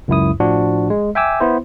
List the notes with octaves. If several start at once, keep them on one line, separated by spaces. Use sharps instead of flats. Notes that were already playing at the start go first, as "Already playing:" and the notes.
C#2 F#2 E4 D#6
A2 F3 D4 F#4
G#3
E5 G5 G#5 D6 E6
B3 E4 C5